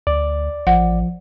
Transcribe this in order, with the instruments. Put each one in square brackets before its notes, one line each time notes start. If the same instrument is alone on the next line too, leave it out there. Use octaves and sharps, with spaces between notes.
[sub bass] D2 [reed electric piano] D5
[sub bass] A1 [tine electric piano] F3 [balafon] F#5